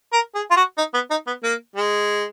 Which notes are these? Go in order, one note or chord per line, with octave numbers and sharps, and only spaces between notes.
A#4
G#4
F4
F#4
D#4
B3
D#4
B3
A#3
G#3